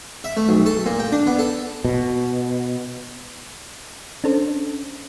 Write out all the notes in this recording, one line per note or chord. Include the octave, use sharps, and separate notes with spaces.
E5
A3
B1
A4
A#2
G5
D4
B3
A4
B2
C#4 D4 A4 C5